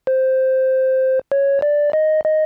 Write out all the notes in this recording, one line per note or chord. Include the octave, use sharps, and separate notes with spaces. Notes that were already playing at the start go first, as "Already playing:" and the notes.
C5
C#5
D5
D#5
D#5